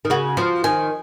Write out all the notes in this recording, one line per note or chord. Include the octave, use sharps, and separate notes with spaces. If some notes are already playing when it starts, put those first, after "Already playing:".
D#3
C#3 F#4
F3 C5
D#3 G#5